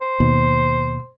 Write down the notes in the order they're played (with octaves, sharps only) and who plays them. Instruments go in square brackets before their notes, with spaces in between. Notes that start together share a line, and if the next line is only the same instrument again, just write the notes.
[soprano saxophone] C5
[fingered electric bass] D#2 [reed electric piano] B2